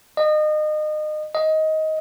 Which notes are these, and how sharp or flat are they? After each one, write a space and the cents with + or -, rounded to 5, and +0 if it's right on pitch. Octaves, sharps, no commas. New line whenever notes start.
D#5 -30
D#5 +15